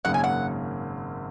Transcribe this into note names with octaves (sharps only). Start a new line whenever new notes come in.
G#1 F#2 C#3 A#3 F#5
G#5
F#5